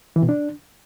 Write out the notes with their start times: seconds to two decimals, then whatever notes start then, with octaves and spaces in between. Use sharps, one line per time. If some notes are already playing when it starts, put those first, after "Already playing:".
0.16 E3
0.22 B2
0.29 D4